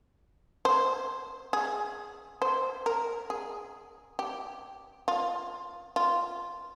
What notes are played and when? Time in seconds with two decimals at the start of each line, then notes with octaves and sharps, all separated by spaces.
0.65 C5
1.53 G#4
2.42 C5
2.86 A#4
3.30 G#4
4.19 G4
5.08 F4
5.96 F4